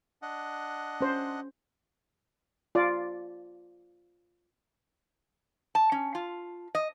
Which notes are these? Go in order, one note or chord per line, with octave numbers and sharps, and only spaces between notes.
D4 D#5 F#5
C#4 C5
F4 D5
A5
C#4
F4
D#5